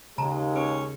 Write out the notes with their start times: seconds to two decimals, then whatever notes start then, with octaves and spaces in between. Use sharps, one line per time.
0.18 D#2 C#3 G#3 A5 A#5
0.56 C#4 A4